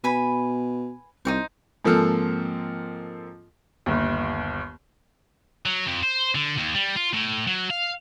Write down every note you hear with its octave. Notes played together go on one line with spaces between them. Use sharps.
B2 B4 G#5 B5
C2 D#4 F#4 C5
G#2 F3 A#3 C4 A4 F6
G1 D#2
F#3
F2
C5
D3
D#2
G3
F4
A2
F#3
F5